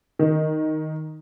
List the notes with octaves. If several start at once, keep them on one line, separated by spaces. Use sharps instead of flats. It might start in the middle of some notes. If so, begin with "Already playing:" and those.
D#3